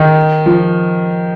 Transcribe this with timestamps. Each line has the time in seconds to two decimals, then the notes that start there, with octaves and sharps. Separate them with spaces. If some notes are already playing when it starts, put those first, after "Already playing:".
Already playing: D#3
0.46 F3